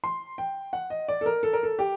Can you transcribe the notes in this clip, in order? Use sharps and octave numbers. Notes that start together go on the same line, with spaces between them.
C6
G5
F#5
D#5
D5
A4
A#4
A4
A#4
A4
G4